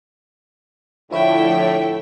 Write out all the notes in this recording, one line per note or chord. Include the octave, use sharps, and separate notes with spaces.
A2 D3 F3 E4 C#5 E5 G5